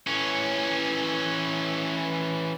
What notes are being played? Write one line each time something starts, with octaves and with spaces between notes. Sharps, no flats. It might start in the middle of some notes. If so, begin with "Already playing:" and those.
E3 C#4